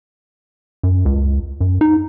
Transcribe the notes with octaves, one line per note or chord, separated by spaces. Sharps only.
F#2
C#2
F#2
D#4